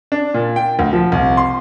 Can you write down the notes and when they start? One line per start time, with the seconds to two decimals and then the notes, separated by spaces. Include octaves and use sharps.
0.12 D4
0.34 A#2
0.56 G5
0.79 D2
0.93 F3
1.12 C2
1.37 C6